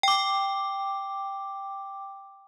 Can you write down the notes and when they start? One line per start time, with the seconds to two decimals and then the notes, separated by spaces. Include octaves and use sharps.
0.03 G5 D6